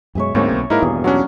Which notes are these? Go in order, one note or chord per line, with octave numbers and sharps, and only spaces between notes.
F#2 B2 G#3 C#5 E5 G#5
D2 G#2 G#3 A#3 C4 C#4 C#5
B1
G#2 A#3 D#4 E4 G#4 A#4
G#1 E2 G2 B2 G#4
F#3 C#4 D4 F#4